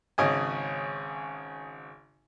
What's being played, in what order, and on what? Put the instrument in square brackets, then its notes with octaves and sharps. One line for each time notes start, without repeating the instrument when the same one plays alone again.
[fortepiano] G#1 C#3 D#5 G#5